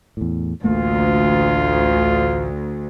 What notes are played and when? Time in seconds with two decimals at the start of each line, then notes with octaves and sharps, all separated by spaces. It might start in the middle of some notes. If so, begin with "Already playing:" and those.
0.17 E2 A2
0.64 A1 D2 A3 A#3 F4